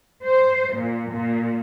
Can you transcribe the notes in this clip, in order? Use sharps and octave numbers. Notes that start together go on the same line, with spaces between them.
C5
A#2
A#2